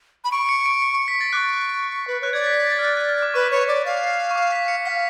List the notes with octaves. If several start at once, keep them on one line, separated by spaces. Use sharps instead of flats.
B5
C#6 D7
C#7
D7
C#7
C#7
B6
A6
C#6 D6 F#6
B4
C#5 F#6
D5 G#6
B6
B6
A6
F6
F#6
F#6
F6
D6
B4 C#6
C#5
C#6
D5
F5
C#6
D6
B6
C#7
F#5 B6
F5